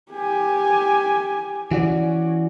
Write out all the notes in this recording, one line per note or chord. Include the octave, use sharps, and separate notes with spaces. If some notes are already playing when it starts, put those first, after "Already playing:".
G4 G#5
E3 C#4 F#4 D5